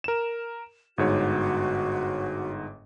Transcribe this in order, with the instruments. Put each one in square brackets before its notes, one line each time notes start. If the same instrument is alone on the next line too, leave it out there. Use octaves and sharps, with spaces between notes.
[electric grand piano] A#4 E7
[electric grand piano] G1 G#2 C#5 [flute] F#4